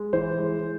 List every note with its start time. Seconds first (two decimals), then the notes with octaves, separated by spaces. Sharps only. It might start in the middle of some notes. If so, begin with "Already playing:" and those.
Already playing: G#3
0.13 E3 C5
0.39 G#3